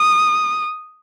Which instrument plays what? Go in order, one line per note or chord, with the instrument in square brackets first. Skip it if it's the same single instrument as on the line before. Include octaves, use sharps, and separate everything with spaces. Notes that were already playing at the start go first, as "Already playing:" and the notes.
Already playing: [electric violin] D#6